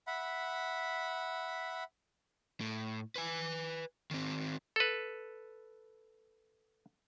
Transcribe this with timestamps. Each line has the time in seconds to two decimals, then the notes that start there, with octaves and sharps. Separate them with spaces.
0.07 E5 F#5 B5
2.61 A2
3.16 B4 G#5
4.11 D#3 C4
4.76 A4 B4